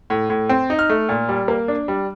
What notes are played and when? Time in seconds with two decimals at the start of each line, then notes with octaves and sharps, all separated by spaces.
0.10 A2
0.30 A2
0.49 C4
0.70 D#4
0.79 F6
0.90 A3
1.09 A#2
1.29 G3
1.48 A#3
1.68 D4
1.88 G3